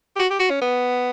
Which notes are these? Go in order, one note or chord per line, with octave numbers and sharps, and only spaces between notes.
G4
F#4
G4
F#4
C#4
B3